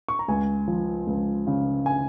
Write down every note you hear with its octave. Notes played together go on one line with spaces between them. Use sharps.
C#6
A#5
C#2 G#5
F3
C#2
C#3
G#5